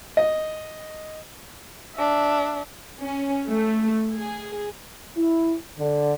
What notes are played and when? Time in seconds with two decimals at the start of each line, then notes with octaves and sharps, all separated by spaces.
0.17 D#5
1.95 D4 E5
3.02 C#4
3.46 A3
4.15 G#4
5.17 E4
5.79 D3